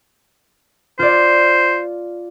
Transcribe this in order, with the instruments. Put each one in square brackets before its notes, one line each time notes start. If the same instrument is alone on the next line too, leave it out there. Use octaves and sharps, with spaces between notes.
[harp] F4 D5 [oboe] C5